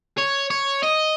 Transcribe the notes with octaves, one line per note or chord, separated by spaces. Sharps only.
C#5
C#5
D#5